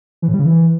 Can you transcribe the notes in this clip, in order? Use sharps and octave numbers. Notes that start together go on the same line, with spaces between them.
E3
A2
G3
C#3
E3